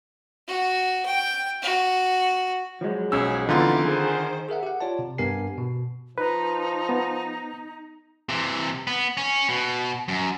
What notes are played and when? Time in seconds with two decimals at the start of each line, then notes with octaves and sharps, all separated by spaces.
0.48 F#4
1.05 G5
1.62 F#4
2.81 F3 F#3 G#3
3.12 B1 C#4 G#4 E6
3.49 F2 D3 E3 B3 D#4 F4 D6
3.85 D#3 G#4 C5
4.49 G#4 A#4 E5 F#5
4.63 G4 F#5
4.80 F4 C#5 D5 A5
4.99 C3
5.18 G2 B3 G4 A#4 G#5 C7
5.58 B2
6.18 F3 D#4 B4
6.89 B3
8.29 C3 E3
8.87 B3
9.17 C#4
9.49 B2
10.08 F#2